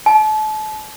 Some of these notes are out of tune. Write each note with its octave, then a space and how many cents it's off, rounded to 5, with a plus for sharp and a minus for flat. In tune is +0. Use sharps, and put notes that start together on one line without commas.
A5 -35